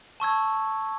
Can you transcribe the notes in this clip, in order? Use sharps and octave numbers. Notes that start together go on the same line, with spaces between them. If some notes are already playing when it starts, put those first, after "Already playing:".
A5 C#6 E6 G#6